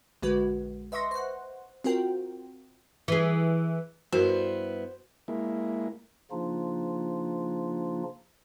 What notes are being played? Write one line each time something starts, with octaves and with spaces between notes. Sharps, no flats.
A#1 D3 G#3 F#4 B4
B4 D#5 E5 C6 C#6 A#6
C5 F#5
C4 F4 F#4 A#4 G5
E3 G#4
G2 B3 E4 F#4 A#4 C5
G#3 A#3 E4
C#3 F3 A#3 D4 D#4 F4